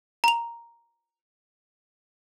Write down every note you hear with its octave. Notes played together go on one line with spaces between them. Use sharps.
A#5 F7